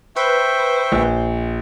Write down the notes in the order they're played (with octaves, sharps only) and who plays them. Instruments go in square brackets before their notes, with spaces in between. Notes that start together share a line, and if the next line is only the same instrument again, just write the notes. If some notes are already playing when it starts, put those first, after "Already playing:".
[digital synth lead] B4 [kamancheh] C5 [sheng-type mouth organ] E5 G5 C#6
[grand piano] A#1